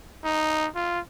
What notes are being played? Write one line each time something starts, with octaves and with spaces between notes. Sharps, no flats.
D#4
F4